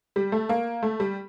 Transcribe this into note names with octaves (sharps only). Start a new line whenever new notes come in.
G3
A3
A#3
A3
G3